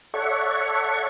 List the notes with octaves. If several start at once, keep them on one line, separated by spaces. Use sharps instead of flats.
A4 C#5 D5 E5 F#5 C#6